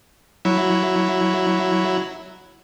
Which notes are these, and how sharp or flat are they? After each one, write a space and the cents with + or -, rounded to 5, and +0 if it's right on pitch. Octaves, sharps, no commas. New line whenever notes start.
F#3 +0 E4 -5